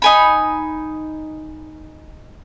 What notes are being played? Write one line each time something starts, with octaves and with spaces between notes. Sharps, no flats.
D#4 G#5 B5